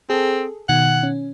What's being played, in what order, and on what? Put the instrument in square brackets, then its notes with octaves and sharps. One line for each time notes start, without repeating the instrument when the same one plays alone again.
[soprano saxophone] C4 [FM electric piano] G#4 A4
[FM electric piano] B2 D#3 G#6 [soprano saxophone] F#5
[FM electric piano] C#4